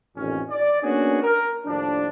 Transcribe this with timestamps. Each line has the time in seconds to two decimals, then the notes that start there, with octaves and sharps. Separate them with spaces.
0.16 A1 F2 A#2 D#3 C#4
0.50 D5
0.83 A#3 B3 C#4 D4 F#4 G#4
1.23 A#4
1.66 D#2 A2 F3 D4